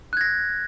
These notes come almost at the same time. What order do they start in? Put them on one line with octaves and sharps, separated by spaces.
F#6 G#6 A#6